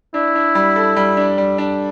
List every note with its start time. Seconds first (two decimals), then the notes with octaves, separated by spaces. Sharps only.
0.14 D4 E4
0.35 D4
0.55 G3
0.76 A4
0.96 G3
1.17 D4
1.38 G3
1.58 D4